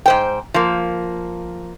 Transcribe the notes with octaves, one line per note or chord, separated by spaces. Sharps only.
G#2 C5 G5
F3 A#3